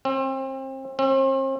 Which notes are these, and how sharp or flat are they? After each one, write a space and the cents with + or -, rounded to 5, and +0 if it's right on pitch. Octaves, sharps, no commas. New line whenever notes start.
C4 +30
C4 +40